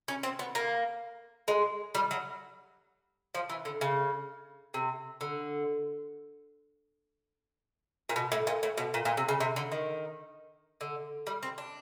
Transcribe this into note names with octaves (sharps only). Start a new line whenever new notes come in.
C#4
C4
B3
A#3
G#3
G3
F#3
F3
E3
D3
C#3
C3
D3
A#2
B2
A2
A#2
A2
B2
A#2
A#2
C3
C#3
C3
D3
D#3
D3
G3
C4
D4